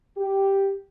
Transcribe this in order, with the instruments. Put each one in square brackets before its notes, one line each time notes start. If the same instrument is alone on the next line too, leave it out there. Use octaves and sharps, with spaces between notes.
[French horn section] G4